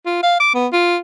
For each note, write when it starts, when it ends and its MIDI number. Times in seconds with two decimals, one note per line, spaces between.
0.06 0.20 65
0.23 0.37 77
0.40 0.52 86
0.54 0.67 59
0.73 0.98 65